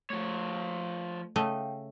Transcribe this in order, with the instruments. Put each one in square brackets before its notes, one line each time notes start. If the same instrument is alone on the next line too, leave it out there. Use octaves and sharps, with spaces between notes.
[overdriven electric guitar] F3 C#5 [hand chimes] A3
[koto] C#3 A3 D#5 [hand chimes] F5 G5